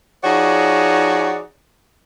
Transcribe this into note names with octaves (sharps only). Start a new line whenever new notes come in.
F3 D#4 F#4 G#4 C#5 D5